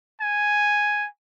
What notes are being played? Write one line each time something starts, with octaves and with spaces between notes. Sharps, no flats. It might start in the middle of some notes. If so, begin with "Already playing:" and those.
G#5